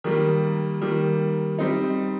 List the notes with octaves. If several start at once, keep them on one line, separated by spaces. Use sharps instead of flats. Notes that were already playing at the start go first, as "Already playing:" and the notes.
D#3 G3 A#3
D#3 G3 A#3
G3 C4 D#4